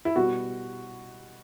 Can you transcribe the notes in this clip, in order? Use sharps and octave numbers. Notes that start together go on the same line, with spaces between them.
E4
B2 G3 B3 F#4